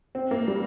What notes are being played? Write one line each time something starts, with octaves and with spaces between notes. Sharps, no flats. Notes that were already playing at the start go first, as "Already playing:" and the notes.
C4
A#3
G3